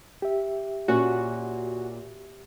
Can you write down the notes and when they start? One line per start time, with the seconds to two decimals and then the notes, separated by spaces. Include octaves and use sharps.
0.22 G4 E5
0.88 A#2 C#4 F#4